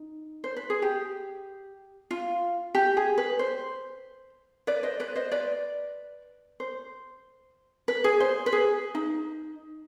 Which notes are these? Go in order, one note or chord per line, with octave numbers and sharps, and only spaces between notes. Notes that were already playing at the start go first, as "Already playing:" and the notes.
Already playing: D#4
C5
B4
G#4
G4
F4
G4
G#4
B4
C5
B4 D5
C5 D#5
B4 D5
C5 D#5
B4 D5
C5
B4
G#4
C5
B4
G#4
D#4